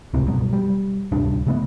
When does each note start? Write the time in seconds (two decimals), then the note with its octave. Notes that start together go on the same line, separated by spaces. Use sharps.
0.14 D#1 C#2 A2 C3
0.27 G2 B2 F#3
0.53 G3
1.12 D1 C2 G2 D4
1.47 C#3 A3 B3